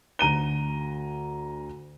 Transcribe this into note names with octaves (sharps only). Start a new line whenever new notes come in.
D2 A#5 D#7 G7